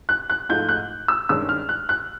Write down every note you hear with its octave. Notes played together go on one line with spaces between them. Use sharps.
F#6
F#6
G#2 F3 A3 G6
F#6
E6
G2 D#3 G#3 C#4 E6
F6
F#6
F#6